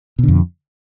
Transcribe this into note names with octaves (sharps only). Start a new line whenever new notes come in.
F2 B2 D3